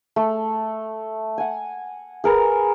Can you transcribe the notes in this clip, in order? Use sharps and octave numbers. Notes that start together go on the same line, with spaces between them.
A3
F#5 G#5
G#4 A#4 B4